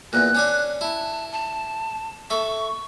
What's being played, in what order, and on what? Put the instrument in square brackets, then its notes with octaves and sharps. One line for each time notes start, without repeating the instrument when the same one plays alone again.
[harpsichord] E2 A#2 [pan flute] F#6
[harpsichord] C#4 D4 G#5
[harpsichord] E4 [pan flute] A5
[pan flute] A5
[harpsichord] A4 E5 [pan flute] C#6